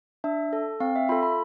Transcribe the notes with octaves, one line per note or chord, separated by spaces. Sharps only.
D4 E5
A4
C4 F5
E5
F4 A4 B5
B5